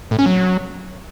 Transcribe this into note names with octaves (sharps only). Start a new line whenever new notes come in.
A2
C#4
F#3